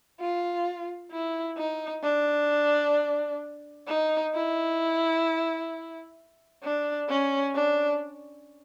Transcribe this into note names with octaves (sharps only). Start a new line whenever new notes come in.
F4
E4
D#4
D4
D#4
E4
D4
C#4
D4